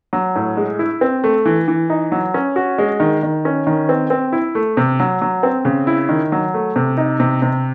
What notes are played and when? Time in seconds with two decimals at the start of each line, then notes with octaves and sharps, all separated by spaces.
0.13 F#3
0.36 A2
0.57 G#3
0.79 E4
1.01 C4
1.24 A3
1.45 E3
1.68 E3
1.90 D#4
2.12 F#3
2.34 C#4
2.56 F#4
2.78 G#3
3.00 D#3
3.23 D#3
3.45 C#4
3.67 D#3
3.89 C4
4.10 C4
4.32 E4
4.55 A3
4.77 C3
5.00 F#3
5.22 F#3
5.43 C4
5.65 C#3
5.87 E4
6.09 D#3
6.32 F#3
6.54 A3
6.76 C3
6.97 D#4
7.20 C3
7.42 C3